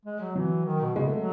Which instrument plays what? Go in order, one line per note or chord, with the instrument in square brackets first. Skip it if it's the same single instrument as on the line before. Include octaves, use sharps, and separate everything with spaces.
[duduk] G#3
F#3
[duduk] E3 [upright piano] F#3
[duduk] D#3
B2
[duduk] C#3 [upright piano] G#3
[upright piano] A3
[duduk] F#3